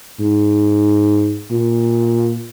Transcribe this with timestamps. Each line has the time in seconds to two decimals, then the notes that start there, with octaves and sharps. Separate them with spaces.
0.20 G#2
1.51 A#2